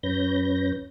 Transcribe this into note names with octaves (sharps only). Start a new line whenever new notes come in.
F#2 C#4 B4 G6 A#6